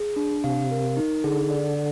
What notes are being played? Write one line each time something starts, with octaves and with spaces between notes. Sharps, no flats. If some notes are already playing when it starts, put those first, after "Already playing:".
Already playing: G#4
D4
C3 F5
A#4
D#4
D3 G#4
D5